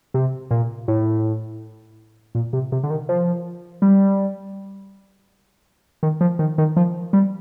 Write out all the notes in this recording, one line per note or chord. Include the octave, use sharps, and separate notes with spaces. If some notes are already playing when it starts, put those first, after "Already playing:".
C3
A#2
A2
A#2
C3
C3
D3
D#3
F3
G3
D#3
F3
D#3
D#3
F3
G3